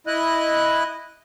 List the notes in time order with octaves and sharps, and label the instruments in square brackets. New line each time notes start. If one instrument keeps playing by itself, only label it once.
[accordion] E4 D#5 F#6